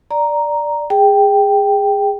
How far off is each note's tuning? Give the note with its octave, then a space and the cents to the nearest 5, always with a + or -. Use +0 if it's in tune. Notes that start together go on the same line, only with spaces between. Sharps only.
D5 +0 A#5 +0
G#4 -15 G5 +0